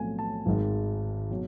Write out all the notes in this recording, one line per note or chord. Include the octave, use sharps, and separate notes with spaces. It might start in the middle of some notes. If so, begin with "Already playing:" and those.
Already playing: B1 A2 F3 A3 C4 G#5
A5
G#1 G#2 D#3
B2 F#3